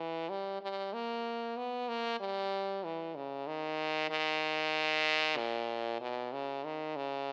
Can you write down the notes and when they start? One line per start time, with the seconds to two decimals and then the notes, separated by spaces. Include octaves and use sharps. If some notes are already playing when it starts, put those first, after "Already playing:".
Already playing: E3
0.30 G3
0.61 G3
0.93 A#3
1.57 B3
1.89 A#3
2.20 G3
2.84 E3
3.15 C#3
3.47 D#3
4.10 D#3
5.37 A#2
6.01 B2
6.33 C#3
6.64 D#3
6.96 C#3